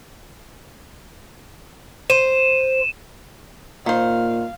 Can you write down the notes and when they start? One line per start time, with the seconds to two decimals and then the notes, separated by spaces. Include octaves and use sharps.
2.10 C5 D#7 E7
3.86 A#2 D#3 C5 F5